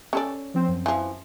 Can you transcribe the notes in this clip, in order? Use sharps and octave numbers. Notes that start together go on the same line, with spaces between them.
C#4 A4 D5
F3 C4 C5
F#2
E3 F3